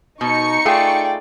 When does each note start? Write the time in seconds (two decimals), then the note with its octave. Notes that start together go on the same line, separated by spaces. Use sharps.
0.21 B2 D#4 C#6 C#7
0.65 A3 F4 G#4 D5 G5